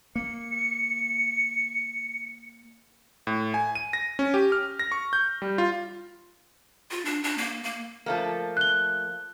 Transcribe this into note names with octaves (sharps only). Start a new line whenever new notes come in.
A#3 C#7
A2
G#5
D#7
A#6
C#4
G4
F6
A#6
C#6
G6
G3
F4
F4
D4
D4
A#3
A#3
F3 A3 A#3
F#6 G7